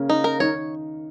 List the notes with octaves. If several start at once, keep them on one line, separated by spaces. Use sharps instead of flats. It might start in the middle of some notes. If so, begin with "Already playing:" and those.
Already playing: C#3 A#3 C#4
D#4
A#4
D#3 D#4 C#5